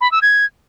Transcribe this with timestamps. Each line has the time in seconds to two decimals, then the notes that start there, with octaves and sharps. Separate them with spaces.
0.01 B5
0.12 E6
0.22 G#6